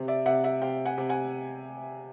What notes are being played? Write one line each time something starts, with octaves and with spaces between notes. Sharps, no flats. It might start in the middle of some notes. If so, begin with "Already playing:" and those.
Already playing: C3
D5 E5
C3 E5 F#5
E5 F#5
C3 F5 G5
F#5 G#5
C3
F#5 G#5